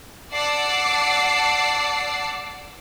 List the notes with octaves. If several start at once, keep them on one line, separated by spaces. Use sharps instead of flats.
D5 F#5 A5 D6 E6 C7